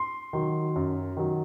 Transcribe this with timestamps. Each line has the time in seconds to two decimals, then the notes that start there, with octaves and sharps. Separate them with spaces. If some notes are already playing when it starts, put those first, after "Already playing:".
Already playing: C6
0.33 D#3 F#3
0.76 F#2
1.17 D#3 F#3